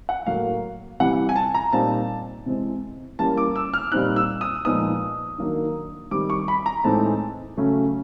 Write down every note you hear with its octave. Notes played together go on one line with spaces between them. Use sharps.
F#5
A2 F#3 A#3 F5
C3 E3 G3 F#5
G#5
A5
A#5
A#2 G3 C4 D#4 A5
C3 E3 G#3 C4
E3 G3 A#3 C#4 A5
D6
E6
F6
A#2 G3 C4 D#4 F#6
E6
D#6
A#2 F3 G#3 B3 D#4 D#6
D#3 F#3 A#3 D4
D#3 G3 C4 D6
C#6
B5
A#5
A2 E3 G#3 C4 D#4 A5
C#3 F#3 A3 C#4